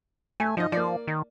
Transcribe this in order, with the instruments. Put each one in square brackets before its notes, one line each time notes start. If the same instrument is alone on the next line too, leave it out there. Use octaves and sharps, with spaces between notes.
[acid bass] A3 [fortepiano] G#5
[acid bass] F3 [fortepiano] D#4 D#5
[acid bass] F3 [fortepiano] A#3 D5
[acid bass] D#3